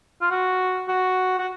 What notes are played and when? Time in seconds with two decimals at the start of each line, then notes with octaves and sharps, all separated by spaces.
0.22 F4
0.31 F#4
0.88 F#4
1.39 F#4